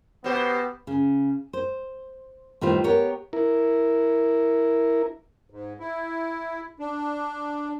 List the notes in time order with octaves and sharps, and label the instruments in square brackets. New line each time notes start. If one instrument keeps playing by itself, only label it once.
[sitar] B2 C5 [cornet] B3 [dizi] G4
[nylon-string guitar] C#3
C5
A2 D#3 G3 F4 B4 C5
B3 G4 A#4 C#5
[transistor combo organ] E4 A#4
[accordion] G#2
E4
D4